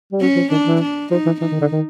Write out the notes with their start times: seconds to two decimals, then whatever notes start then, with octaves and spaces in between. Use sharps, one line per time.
0.12 G3
0.21 F#3 C#4
0.36 F3
0.51 D#3 D4
0.66 E3
0.82 D4
1.11 F3 D#4
1.26 E3
1.41 E3 D#4
1.52 D#3
1.61 D3
1.72 D#3